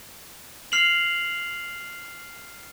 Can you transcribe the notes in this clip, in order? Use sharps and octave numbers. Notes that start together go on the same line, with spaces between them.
F6 C7 F7 F#7